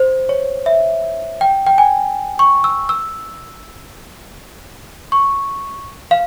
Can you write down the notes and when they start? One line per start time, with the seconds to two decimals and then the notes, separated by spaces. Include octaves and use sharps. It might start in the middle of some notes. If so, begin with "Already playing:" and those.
Already playing: C5
0.29 C#5
0.66 E5
1.41 G5
1.67 G5
1.78 G#5
2.39 C#6
2.64 E6
2.89 E6
5.12 C#6
6.11 F5